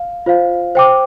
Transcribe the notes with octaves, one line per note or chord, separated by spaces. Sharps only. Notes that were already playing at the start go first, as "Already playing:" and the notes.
Already playing: F5
F4 C5 F5
C5 G5 D6